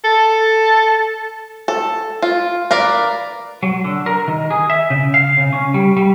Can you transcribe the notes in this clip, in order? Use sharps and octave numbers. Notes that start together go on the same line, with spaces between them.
A4
A4
F4
A#4 B4 D5 F5
F#3
D3
A#4
D#3
G#4
E5
C#3
F5
C#3
C#4
G3
G3